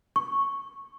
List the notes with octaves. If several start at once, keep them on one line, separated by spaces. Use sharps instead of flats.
C#6